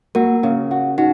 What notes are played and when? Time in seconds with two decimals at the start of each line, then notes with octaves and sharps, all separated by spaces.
0.15 A#3 F#4 A#4
0.43 C#3
0.71 F#4
0.98 D#4 F#4